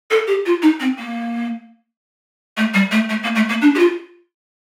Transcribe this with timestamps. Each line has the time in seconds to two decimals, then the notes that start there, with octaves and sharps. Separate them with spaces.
0.11 A4
0.27 G4
0.46 F4
0.62 D#4
0.80 C4
0.99 A#3
2.57 A3
2.74 G3
2.91 A3
3.10 A3
3.23 A#3
3.35 A3
3.49 A#3
3.61 D4
3.75 G4
3.79 F4